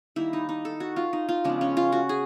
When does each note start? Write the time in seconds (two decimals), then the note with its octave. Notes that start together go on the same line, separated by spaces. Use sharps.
0.16 D#3 G3 A#3 E4
0.33 D#4
0.49 D#4
0.65 A4
0.80 F#4
0.96 F4
1.13 D#4
1.29 F4
1.44 C#3 F3 G#3 B3 D4
1.61 C#4
1.77 F4
1.92 F#4
2.09 G#4